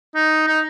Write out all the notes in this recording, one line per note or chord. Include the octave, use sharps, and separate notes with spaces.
D#4
D#4